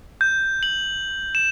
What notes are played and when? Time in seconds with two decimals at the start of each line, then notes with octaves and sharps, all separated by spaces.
0.21 G6
0.63 F#7
1.35 E7